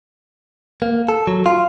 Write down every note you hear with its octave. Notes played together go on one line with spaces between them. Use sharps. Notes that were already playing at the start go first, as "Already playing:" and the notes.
A#3
A4
F#3
F4